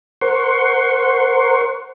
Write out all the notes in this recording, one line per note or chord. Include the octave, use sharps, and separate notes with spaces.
A#4 C5 F#5 C6 C#6